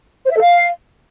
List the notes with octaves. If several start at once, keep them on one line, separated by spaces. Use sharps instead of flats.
C5
E5
A4
F5